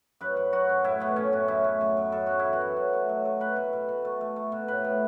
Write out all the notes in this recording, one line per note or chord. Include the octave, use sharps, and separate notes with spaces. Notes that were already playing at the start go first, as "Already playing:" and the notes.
F#2 B4
F#2
F#3 F#4
F#2
A2 E4
A3 B3
A2 C#4
A2 F#4
F#2 E4
A3
F#2
F#2
F#2 A4
F#2 F#4
E4
E3
F#4
E3
F#3
A3
F#3
A3
A3 B4
B2
B2
B2
A3
A3
A3
B2
A2 B4
A2